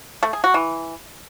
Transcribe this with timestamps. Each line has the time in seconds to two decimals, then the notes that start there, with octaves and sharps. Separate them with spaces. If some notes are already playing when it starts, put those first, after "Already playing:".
0.23 A3
0.33 G#4
0.44 F#4
0.54 E3